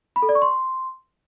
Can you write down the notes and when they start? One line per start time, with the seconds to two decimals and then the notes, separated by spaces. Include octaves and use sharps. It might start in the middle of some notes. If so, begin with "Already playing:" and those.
0.16 B5
0.22 A4
0.29 D5
0.35 C#6
0.42 C6